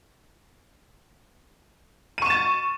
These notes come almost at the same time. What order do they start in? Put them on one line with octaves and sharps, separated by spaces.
D#7 C#6 E7 A6